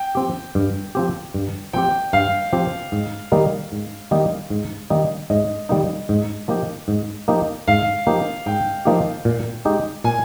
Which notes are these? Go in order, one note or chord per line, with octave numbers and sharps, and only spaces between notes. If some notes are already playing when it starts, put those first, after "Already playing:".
Already playing: G5
F3 C4 G4
G2
F3 C4 G4
G2
F3 C4 G4 G5
G2 F5
F3 C4 G4
G#2
D#3 G3 A#3 D#4
G#2
D#3 G3 A#3 D#4
G#2
D#3 G3 A#3 D#4
G#2 D#5
D#3 G3 A#3 D#4
G#2
F3 A#3 D#4 G4
G#2
F3 A#3 D#4 G4
G#2 F5
F3 A#3 D#4 G4
G#2 G5
F3 A#3 D#4 G4
A#2
G#3 D#4 G4
A#2 G#5